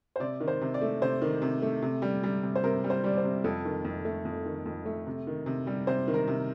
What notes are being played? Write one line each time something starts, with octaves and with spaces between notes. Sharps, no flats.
C5
C3 D5
D#3
C5
C3
D5
A3
C3 C5
D#3
C3
A3
C3
G3
G3
C3
C5
C3 A#4
G3
C5
G3 D5
C5
C3
F2 A4
D#3
F2
A3
F2
D#3
F2
A3
C3
D#3
C3
G3
C3 C5
D#3
A#4
C3